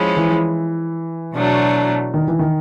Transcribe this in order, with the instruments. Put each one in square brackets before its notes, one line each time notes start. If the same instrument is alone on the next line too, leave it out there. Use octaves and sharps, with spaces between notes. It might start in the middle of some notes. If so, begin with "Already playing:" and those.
Already playing: [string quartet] F3 G#3 C#4 E4
[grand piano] E3
[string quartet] B2 F#3 A3 D4
[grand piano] D#3
E3
D#3